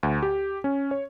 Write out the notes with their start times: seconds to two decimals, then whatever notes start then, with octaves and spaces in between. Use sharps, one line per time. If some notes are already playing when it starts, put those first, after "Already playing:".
0.03 D2
0.23 G4
0.64 C#4
0.91 C#5